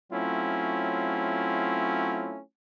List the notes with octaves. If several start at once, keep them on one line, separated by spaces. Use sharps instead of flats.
F#3 A3 C4 C#4 E4 F4